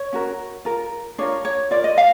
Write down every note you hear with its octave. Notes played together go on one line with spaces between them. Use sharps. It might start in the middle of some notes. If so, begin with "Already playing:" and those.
Already playing: C#5
C#4 F#4 A#4
F4 A#4
D4 F4 A#4 C#5
C#5
F4 A#4 D5
D#5
F5